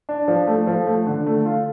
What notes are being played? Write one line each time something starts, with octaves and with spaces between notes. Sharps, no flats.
D4
F3
A3
F3
A3
D3
A3
F4